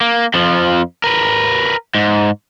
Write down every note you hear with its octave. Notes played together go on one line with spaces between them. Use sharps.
A#3
F2 F3
A#4 B4
G#2